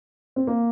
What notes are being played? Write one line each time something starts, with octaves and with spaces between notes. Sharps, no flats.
C4
A#3